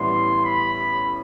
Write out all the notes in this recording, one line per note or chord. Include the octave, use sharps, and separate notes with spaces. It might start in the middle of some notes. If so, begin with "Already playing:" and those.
Already playing: A1 A2 G3 B3 E4 C6
B5